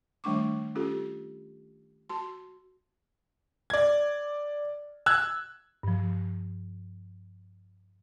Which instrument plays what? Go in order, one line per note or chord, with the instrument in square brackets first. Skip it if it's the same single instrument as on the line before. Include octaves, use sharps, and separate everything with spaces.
[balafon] D#3 G3 A3 D4 C#6 D6
C#4 F4 G4 A4
F#4 A5 C6
[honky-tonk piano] D5 G#6
E6 F#6 G#6
[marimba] G2 F3